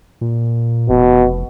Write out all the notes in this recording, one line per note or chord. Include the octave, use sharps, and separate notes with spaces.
A#2
F1 B2